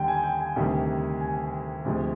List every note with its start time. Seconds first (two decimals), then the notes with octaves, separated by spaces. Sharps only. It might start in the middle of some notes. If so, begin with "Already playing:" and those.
Already playing: D#2 D3 G3 G5
0.08 G#5
0.24 G5
0.40 G#5
0.56 D2 C3 D#3 G3
1.21 G#5
1.85 D2 C3 F3 G#3